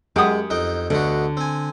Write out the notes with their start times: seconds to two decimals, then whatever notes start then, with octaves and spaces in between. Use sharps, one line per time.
0.16 F#2 G#3 G4 F#5 D#6
0.50 F2 D#4 G5
0.90 D2 B2 D3 F#4
1.37 C4 G#5